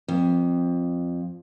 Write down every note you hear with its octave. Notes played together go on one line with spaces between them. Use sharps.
F2